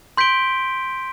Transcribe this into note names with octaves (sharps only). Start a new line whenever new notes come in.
C6 G6 B6 D7 G7